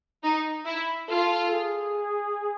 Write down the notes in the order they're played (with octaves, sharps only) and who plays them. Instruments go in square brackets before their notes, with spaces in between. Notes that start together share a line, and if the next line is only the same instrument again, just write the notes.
[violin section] D#4
E4
[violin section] F4 [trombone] A4
[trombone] G#4